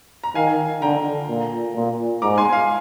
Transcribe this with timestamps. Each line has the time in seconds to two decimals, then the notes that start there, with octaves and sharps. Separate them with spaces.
0.24 A#5
0.35 D#3 F5 G#5
0.82 D3 G5 A#5
1.29 A#2
1.75 A#2
2.22 G#2 A#5 D6
2.38 G#5 C6
2.53 F5 G#5